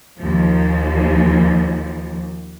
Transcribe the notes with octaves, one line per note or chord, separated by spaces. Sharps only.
D#2 F3